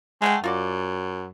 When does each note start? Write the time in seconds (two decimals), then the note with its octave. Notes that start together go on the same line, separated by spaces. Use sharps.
0.22 G#3 A3 F#5 G5
0.44 F#2 F4 F#4 D5